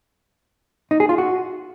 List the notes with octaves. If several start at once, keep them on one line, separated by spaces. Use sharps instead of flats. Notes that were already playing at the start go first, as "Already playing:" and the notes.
D#4
G#4
F4
F#4